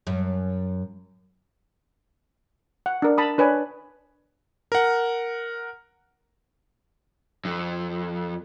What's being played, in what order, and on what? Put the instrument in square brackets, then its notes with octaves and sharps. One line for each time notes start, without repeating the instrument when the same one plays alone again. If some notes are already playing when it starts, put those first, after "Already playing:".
[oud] F#2
[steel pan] F#5
D4 A#4
A5 B5 D#6
D4 B4 C#5 G#5
[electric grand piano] A#4 F#5
[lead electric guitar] F2